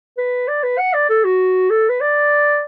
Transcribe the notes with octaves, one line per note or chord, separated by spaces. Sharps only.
B4
D5
B4
F#5
D5
A4
F#4
A4
B4
D5